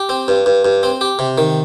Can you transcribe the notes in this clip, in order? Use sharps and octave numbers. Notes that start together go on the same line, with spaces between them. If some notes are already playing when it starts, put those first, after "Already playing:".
Already playing: G4
C4
G2
G2
G2
C4
G4
C3
D#3